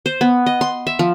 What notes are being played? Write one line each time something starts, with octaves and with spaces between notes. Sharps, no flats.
C5
B3
D#5
C6
E5
F3